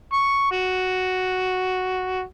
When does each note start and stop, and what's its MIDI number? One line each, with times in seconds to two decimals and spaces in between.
0.13 0.49 85
0.52 2.21 66